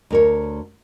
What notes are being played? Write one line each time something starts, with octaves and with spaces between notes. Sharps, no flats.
D2 A#4 C#5